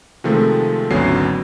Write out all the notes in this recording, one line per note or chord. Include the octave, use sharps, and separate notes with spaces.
C3 D#3 F3 G#3 A3 C4
G#1 D2 F#3 B3 C#4 C7